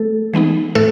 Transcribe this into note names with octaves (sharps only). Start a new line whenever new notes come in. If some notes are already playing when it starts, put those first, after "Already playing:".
Already playing: A3 A4
E3 G#3 B3 D#4
A2 A3 A4